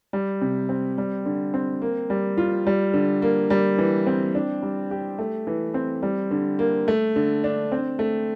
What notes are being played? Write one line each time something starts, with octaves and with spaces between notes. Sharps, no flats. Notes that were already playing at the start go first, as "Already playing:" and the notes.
G3
C3
C4
G3
D3
C4
A#3
G3
F4
G3
D3
A#3
G3
E3
C4
D4
G3
G4
A3
E3
C4
G3
D3
A#3
A3
D3
D4
C4
A3